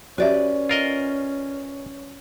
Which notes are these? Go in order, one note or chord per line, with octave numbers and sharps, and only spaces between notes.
C#4 F#4 G4 B4 D5 E5
F4 A#4 D#5